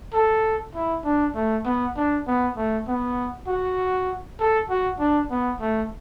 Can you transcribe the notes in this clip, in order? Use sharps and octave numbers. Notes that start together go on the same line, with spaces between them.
A4
E4
D4
A3
B3
D4
B3
A3
B3
F#4
A4
F#4
D4
B3
A3